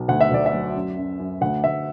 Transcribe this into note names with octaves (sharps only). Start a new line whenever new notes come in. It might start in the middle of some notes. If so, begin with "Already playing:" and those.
Already playing: B1
D2 F#5
E5
D2 D5
E5
F#3
F#2
F#2
F#2
D2 F#5
D2 E5